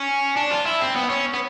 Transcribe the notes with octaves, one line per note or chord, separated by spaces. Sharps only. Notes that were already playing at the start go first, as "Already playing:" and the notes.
Already playing: C#4
D4
F4
E4
C4
B3
C#4
B3